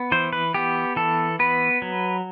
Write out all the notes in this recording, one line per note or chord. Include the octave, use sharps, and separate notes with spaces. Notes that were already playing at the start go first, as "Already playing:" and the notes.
Already playing: B3
E3 C5
B4
B3 G4
E3 A4
B3 B4
F#3